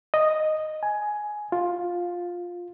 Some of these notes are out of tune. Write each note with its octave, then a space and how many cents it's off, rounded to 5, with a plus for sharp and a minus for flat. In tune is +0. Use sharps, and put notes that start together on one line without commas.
D#5 -5
G#5 +10
F4 +10